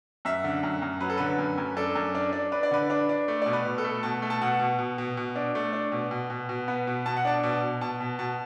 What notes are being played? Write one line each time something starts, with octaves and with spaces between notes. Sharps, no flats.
F#2 E5
D3
F#2
F#2
F#3 B4
A4
D3 B4
F#2
F#2
D4 A4
F#2
D4
D4
D4 B4
D5
D3 B4
D4
D4
A3
B2 D5
B4
B2
A4
A3
B2 A5
A3
A5
B2 F#5
B2
B2
B2
B2
D4
A3
D4
B2
B2
B2
B2
B3
B2
B2 A5
F#5
D4 A5
B2
B2
B2 A5
B2
B2 A5